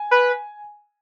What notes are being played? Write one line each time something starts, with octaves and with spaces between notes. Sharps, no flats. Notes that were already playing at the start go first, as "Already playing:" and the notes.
Already playing: G#5
B4